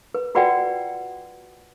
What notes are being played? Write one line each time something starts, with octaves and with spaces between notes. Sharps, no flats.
B4
F4 F#4 B4 D5 F#5 G5